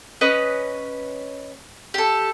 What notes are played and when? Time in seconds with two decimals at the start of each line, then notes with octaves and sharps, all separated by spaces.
0.21 C#4 B4 D#5
1.94 G4 A4